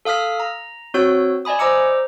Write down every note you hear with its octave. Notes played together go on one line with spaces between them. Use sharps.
A4 F5 D#6 F6 B6
A#5
C4 F#4 C#5 E6 G6
D5 D#5 G#5 B5 D#6
C5 D#5 A#5 D6 E6 C#7